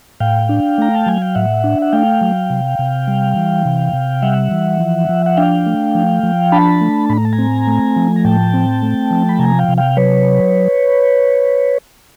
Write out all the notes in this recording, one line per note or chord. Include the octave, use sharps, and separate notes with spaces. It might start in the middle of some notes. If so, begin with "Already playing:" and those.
A2 F5 G5
D4
A3 A#5
A5
F#3 G#5
G5
A2 E5 F#5
D4
F#5
A3 F5 G5
F#3
C3
C3
G3
E3
C3
C3
G3 E5 F#5
E3
F3
F3
F#5
D4 F5 G5
A3
F3
F3
D4 A5 B5
A3
A2 B5
A#5
A5
G#5 A#5
C4
A3
F3
A#5
A2 G5 A5
C4
A3
F3
B5
C3 G#5 A#5
F5 G5
C3
F5 G5
F#3 B4 C#5